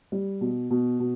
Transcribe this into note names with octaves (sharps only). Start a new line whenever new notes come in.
G3
B2
B2
B2